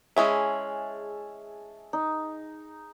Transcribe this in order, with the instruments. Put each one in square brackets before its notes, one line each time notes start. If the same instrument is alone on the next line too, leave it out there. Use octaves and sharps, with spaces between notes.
[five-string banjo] G#3 C#4 E4 [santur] G#4 E5 A5
[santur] D#4